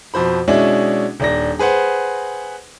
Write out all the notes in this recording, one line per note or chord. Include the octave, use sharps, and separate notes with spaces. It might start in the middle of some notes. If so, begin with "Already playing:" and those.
F2 B2 C5 B5
B2 G#3 C#4 D4 E4
D#1 D4 A#6
G#4 B4 C5 F#5